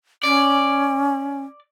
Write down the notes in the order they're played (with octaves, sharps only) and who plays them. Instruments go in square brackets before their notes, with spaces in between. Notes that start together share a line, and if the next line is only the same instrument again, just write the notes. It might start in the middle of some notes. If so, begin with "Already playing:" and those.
[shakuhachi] C#4 [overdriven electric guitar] D5